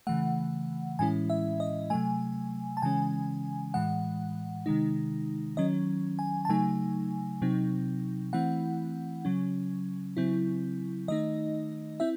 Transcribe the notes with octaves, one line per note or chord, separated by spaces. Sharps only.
C#3 E3 A3 F#5
A2 E3 G#3 C#4 E4 G#5
E5
D#5
C3 F#3 A3 G#5
A5
C#3 E3 G#3 C#4 G#5
A2 E3 G#3 F#5
C3 D#3 G#3 D#4
D#3 F#3 C#4 D#5
G#5
A5
C#3 F#3 A3 D#4 G#5
C3 F#3 C4 D#4
E3 A3 C4 E4 F#5
C#3 F#3 C#4
C#3 F#3 C4 E4
D#3 A3 D#4 D#5
C4 E4 E5